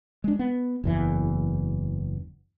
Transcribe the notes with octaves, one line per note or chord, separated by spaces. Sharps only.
G#3 D4
B3
F#1 E2 E3